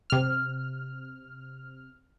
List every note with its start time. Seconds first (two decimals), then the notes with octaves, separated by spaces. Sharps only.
0.10 C3 F6